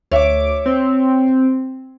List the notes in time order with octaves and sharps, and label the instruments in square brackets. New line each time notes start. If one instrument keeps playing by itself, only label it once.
[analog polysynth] D2 D6 [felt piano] C#5 E5
[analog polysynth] C4